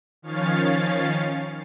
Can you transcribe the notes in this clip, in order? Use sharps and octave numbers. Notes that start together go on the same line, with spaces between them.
D#3 F3 C#4 C#5 F5 A6